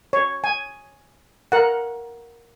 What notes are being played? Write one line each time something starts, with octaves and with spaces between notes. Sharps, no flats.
C#5
G#5
A#4 F#5